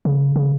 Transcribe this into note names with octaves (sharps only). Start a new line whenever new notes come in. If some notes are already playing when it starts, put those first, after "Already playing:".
C#3
C#3